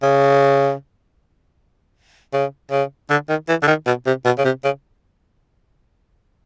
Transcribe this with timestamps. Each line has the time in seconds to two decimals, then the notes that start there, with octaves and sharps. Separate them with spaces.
0.03 C#3
2.33 C#3
2.71 C#3
3.10 D3
3.29 D#3
3.49 E3
3.63 D3
3.67 D#3
3.86 B2
4.06 C3
4.25 B2
4.38 C#3
4.45 C3
4.64 C#3